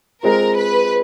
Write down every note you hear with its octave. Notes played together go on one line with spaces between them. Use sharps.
G#3 C4 F4 A#4
B4